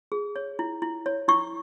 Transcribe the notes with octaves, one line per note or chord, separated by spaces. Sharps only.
G#4
C#5
E4
E4
C#5
E4 C#6